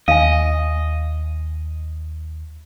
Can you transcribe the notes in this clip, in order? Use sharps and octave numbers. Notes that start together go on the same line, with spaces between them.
D#2 D#5 F5 G#5